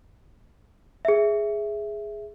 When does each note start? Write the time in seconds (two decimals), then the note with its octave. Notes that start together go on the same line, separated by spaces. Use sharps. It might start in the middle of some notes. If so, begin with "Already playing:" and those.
1.05 G#4 E5